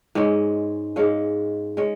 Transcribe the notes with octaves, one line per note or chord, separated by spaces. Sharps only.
G#2 G#3 C#4
G#2 G#3 C#4 F5
G#3 C#4